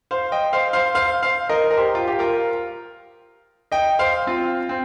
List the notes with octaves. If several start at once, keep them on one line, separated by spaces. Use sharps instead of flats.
C5 F5
D#5 G5
C5 F5
C5 F5
C5 F5
C5 F5
A#4 D#5
A#4
G4 C5
F4
G4
F4 A#4
D#5 G5
C5 F5
C4 F4
C4